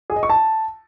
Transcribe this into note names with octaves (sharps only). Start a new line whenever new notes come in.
G#4
D#5
C#6
A5